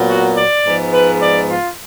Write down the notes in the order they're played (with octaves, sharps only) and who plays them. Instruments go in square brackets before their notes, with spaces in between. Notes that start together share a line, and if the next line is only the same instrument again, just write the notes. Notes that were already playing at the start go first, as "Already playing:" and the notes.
Already playing: [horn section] A#2 F#3 B3
F#4
D5
G#2 F3 G#3 B3
B4
D5
F4